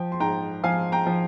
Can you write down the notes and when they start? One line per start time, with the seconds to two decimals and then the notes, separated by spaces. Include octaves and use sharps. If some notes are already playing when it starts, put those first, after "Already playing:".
Already playing: F3 G5
0.12 C6
0.20 G#2 G5 A#5
0.63 F3 F5 G#5
0.92 G5 A#5
1.07 F3